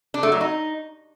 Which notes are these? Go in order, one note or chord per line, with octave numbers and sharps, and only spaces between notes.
D4
A3
F#3
D#4